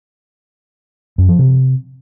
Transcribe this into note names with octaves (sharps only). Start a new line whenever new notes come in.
F#2
F3
C3